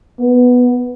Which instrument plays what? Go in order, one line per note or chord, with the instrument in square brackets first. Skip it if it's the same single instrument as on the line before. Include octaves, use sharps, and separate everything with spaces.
[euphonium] B3